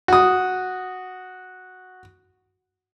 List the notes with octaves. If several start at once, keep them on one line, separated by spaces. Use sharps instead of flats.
F#4 D#6